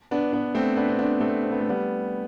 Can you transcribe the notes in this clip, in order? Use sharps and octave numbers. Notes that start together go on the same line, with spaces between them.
B3 D4
B3 D4
A3 C4
B3 D4
C4
B3 D4
A3 C4
C4
B3
A3
G3 B3